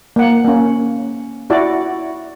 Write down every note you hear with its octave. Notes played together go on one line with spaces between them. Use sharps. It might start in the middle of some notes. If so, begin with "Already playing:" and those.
A#3 F#5
A#3 C#4
E4 F#4 D5